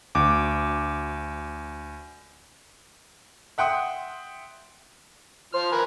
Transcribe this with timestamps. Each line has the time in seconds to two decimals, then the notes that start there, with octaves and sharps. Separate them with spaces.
0.15 D2 D6
3.58 E5 F#5 G5 C6 D#6
5.54 F3 C5 F6
5.72 A#4 B4 G#5